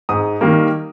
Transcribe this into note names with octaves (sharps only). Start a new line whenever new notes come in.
G#2 D#6
D#3 G3 A#3